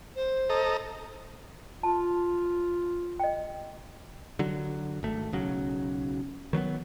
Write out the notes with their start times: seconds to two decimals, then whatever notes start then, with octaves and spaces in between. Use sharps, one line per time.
0.15 C5
0.50 A4 D#5 A#5
1.83 F4 A5
3.20 D#5 G5
4.39 D3 F#3
5.03 G#1 A3
5.32 B1 C#3 F#3
6.53 D#3 F#3 A#3 B3